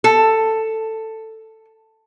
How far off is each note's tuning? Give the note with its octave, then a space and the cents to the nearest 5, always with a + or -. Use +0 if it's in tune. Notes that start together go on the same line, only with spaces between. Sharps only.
A4 +10